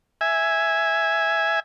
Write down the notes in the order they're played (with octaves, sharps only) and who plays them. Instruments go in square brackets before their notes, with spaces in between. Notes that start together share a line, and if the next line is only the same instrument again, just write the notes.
[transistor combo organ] E5 G#5